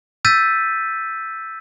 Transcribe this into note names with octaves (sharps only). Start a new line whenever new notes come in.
E6 G6 A6 B6 D#7